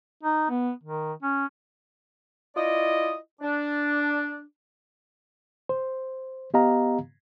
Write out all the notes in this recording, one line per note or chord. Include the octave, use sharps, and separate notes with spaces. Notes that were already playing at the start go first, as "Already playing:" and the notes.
D#4
B3
D#3
C#4
E4 F4 D5 D#5
D4
C5
B3 G4 D#5 F5 A#5